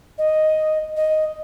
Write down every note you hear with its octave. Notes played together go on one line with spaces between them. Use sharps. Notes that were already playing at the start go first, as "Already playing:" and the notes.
D#5
D#5